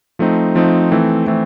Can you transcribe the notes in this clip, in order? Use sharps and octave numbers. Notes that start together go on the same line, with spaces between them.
F3 A3 C4 D#4
F3 A3 C4 D#4
E3 A3 C4
E3 A3 C4